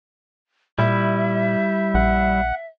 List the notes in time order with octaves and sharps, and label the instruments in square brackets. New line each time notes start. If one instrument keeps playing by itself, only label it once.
[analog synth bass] A#2 [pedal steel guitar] G3 E4 [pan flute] E5
[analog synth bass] A#1 [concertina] F#5